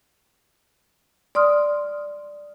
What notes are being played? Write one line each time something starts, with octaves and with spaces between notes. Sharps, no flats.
D5 C6 D#6 F6